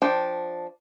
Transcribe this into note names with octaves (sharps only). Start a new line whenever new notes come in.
F3 D4 G5